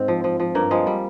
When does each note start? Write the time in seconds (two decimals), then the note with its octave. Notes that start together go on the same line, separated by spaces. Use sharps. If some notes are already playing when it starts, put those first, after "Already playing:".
Already playing: G#2 C4
0.08 F3
0.24 F3
0.40 F3
0.55 G2 A#3
0.71 F3 G#3
0.87 G3